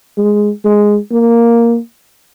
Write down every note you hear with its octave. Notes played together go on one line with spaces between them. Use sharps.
G#3
G#3
A#3